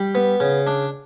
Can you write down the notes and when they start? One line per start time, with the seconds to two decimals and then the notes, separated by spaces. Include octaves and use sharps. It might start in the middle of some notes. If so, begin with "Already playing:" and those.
Already playing: G3
0.15 B3
0.40 C#3
0.67 D4